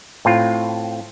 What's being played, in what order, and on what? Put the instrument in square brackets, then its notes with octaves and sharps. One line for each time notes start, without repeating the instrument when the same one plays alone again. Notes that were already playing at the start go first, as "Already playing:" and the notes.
[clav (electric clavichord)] A2 C4 F4